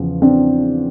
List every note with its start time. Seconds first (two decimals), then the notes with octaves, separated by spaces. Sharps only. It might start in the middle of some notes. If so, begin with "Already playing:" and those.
Already playing: E2 C#3 F3
0.22 C4 D4